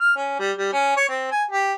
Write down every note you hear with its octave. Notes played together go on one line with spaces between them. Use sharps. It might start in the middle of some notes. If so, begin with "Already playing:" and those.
F6
C#4
G3
G3
C#4
C#5
C4
G#5
G4